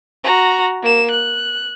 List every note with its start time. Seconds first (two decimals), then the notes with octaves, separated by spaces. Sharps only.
0.24 F#4 A#5
0.82 A#3 E7
1.11 F#6